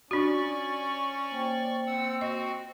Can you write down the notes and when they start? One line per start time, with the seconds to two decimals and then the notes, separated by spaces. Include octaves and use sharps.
0.11 C#4 D4 F4 F#4 D5 C#6
1.31 A#3 C5 G5
1.87 C4 F#5 E6
2.21 F#4 D#5